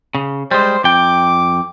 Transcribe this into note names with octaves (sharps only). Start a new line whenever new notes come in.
C#3
G3 G#3 C5
F2 G5 D6